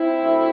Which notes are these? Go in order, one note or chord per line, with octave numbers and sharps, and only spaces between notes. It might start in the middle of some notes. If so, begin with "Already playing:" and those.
Already playing: C4 E4
D2